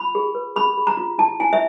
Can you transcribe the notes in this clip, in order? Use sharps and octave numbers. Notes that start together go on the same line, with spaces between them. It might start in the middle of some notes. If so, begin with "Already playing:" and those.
Already playing: F4 B5
G#4
B4
G#4 B5
G#4
A#5
F4
E4 A5
E4 G#5
E5